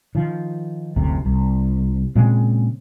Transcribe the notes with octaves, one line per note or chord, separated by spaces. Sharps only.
D#3 F3
F#1 D2 C3
C2
A#2 C#3 G#3 C4